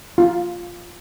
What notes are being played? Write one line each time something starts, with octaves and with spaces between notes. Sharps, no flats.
F4